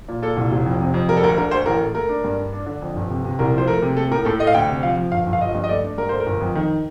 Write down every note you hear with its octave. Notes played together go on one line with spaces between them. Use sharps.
A#2
A#2 A4
C2
F1
F2
C3
F2
G3 A#4
A4
D2 A#4
D3 A#4
D2 C5
A1 A#4
A3
A3 A#4
D4
G2
D4
D4
D3
F2
G1
C3
C3
C2 A#4
F3 C5
A3 A#4
C3
A3 A4
A2 A#4
A2 A4
A3 D#5
F5
D2 G5
C3
F3 F5
F3
G1 F5
G1
F5
F3 D#5
G2
D#5
A3 D5
D4
G2 A#4
A3 C5
A#4
G1
F2
D#3